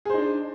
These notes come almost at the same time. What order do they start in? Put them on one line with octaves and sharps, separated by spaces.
G#4 C5 D#4 D4